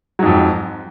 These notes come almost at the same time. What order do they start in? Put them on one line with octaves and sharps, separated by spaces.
F#3 G#2 F2